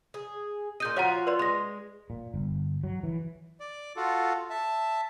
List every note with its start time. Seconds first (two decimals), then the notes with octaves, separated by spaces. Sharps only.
0.14 G#4
0.80 A#2 D#5 G6 D#7
0.96 F3 F4 F#4 C#5 F#5 A#5
1.27 B4 D5 C6
1.39 G#3 C6 A#6
2.10 A#2
2.34 G1
2.84 F#3
3.03 E3
3.60 D5
3.97 F4 F#4 A4
4.50 E5 A5